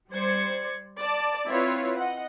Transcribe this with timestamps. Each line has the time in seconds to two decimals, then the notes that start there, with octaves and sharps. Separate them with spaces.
0.11 G3 C5 D5 G#6 C#7
1.00 D5 A5
1.47 C4 E4 F4 B4 C#5
1.98 D#5 F#5